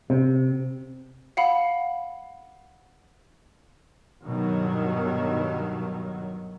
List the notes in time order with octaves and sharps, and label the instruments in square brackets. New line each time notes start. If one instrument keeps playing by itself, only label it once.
[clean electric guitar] C3
[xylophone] F5 F#5 B5
[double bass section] G2 B2 D#3 F#3